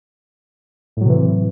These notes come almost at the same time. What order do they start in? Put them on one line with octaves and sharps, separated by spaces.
A2 F#3 C3 E3